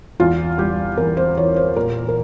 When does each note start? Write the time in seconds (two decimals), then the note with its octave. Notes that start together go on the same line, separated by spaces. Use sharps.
0.20 E2 F4
0.58 G3 G4
0.97 E2 A#4
1.17 C5
1.37 E3 C#5
1.56 C5
1.76 A#2 A#4
2.08 A#4